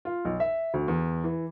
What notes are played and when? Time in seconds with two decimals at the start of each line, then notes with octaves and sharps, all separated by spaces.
0.05 F4
0.25 B1
0.40 E5
0.74 D2
0.88 E2
1.24 E3